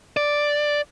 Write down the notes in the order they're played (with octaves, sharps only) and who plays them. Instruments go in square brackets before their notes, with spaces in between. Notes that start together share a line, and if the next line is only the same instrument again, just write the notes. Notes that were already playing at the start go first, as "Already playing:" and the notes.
[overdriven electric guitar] D5